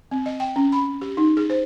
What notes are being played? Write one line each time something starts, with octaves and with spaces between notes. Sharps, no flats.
C4
D#5
G5
C#4
B5
G4
D#4
G#4
C5